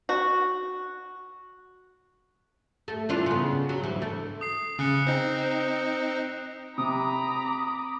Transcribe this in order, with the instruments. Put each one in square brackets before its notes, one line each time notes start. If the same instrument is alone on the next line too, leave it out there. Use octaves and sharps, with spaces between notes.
[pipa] F#4
[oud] A3
E3 D4 F4
C#3 B3
F#3
D2 E3
A3
[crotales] D#6 C7
[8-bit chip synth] C#3 [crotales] D#6 F#6 C#7
[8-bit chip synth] C4 D#4
[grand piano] C3 [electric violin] A#5 B5 [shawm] D6 [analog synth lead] D#6